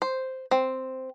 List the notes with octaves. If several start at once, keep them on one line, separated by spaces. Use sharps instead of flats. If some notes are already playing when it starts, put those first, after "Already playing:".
C5
C4